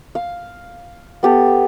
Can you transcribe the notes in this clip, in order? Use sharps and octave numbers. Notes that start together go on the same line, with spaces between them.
F5
B3 G4 A4